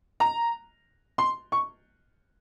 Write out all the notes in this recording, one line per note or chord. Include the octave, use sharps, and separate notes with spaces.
A#5
C6
C#6